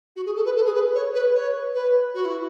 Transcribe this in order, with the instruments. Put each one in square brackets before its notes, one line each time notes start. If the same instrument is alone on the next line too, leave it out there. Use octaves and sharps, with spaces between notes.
[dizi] F#4
G#4
A4
B4
A4
G#4
B4
C#5
B4
C#5
B4
F#4
E4